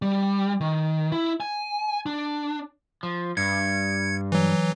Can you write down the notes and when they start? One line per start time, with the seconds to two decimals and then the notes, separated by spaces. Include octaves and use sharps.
0.02 G3
0.61 D#3
1.12 E4
1.40 G#5
2.06 D4
3.03 F3
3.37 G2 G#6 C#7
4.32 E3 F#3